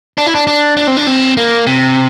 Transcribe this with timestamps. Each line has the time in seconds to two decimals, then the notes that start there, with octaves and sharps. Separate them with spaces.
0.18 D4
0.26 E4
0.35 D4
0.47 D4
0.77 D4
0.87 C4
0.97 D4
1.07 C4
1.37 A#3
1.67 C3